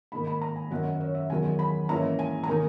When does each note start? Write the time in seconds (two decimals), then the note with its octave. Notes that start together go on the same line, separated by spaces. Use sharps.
0.12 G#2 D#3 A#3 B5
0.27 B5
0.42 A#5
0.56 G#5
0.71 F#2 D#3 F#3 F#5
1.01 C#5
1.15 E5
1.29 E2 D#3 F#3 G#5
1.59 B5
1.89 G#2 E3 A#3 C#4 E4 A#5
2.19 G#5
2.44 A#5
2.47 D#3 A#3 D#4 G#5